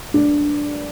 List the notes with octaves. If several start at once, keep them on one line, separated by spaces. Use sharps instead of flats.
D4